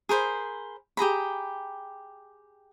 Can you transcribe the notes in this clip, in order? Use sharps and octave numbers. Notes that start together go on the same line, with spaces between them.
G#4 A#4 C5 B5
G4 G#4 A#5 B5